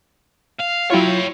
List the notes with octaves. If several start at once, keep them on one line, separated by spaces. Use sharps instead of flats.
F5
F#3 E4 F4 C#5 G5